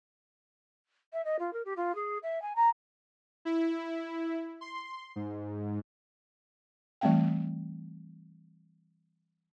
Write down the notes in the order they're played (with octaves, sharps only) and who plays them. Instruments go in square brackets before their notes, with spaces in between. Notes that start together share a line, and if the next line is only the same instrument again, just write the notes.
[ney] E5
D#5
F4
A#4
G4
F4
G#4
E5
G#5
A#5
[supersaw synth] E4
C6
G#2
[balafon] E3 G3 A3 C4 F5 G5